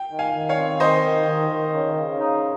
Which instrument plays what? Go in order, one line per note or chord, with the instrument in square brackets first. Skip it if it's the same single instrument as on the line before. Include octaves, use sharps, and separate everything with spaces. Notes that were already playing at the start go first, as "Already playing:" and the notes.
Already playing: [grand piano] G5
[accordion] D#3
[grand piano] F5 G#5
[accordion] D#3
[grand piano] C#5 F5
[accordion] C4
[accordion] D#3 [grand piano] C5 D#5
[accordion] D#3
D#3
D#3
C#3
C#3
D#4